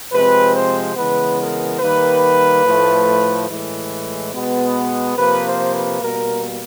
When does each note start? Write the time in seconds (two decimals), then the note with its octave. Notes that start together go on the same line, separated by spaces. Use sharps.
0.12 C3 F3 G#3 C4 B4
0.54 C5
0.95 C#3 E3 G#3 B3 B4
1.39 A#4
1.80 D#3 G3 A#3 B4
2.65 A2 F3 A3
3.48 A2 E3 G#3
4.33 B2 G#3 B3
5.17 C3 F3 A#3 B4
5.45 C5
5.73 B4
6.01 B2 G3 A#3 A#4